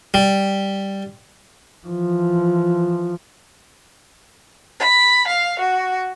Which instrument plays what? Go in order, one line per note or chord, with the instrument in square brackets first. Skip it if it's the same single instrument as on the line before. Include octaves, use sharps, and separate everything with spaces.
[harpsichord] G3
[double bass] E3 F3
[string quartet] B5
F5
F#4